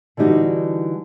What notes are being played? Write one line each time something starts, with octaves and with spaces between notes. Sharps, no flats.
D3 E3 G3 D#4 F#4